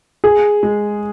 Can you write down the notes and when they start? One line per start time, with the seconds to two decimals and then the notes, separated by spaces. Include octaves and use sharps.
0.24 G#4
0.63 G#3